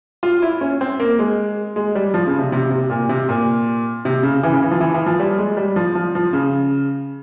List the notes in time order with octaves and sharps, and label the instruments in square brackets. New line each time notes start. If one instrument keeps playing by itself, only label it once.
[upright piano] F4
E4
C#4
C4
A#3
G#3
G#3
G3
F3
C#3
C3
C3
C3
A#2
C3
A#2
C3
C#3
E3
C#3
E3
F3
E3
E3
F3
G3
G#3
G3
F3
F3
F3
C#3